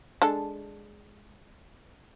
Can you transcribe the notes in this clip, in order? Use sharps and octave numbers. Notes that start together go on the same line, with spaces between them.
G#3 D4 A4